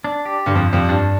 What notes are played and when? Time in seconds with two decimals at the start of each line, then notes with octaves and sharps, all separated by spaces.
0.04 D4
0.25 G4
0.46 G2 D3
0.55 F2
0.68 F2 G3
0.89 G2 D4